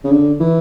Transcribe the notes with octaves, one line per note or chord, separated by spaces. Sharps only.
C#3
D3
E3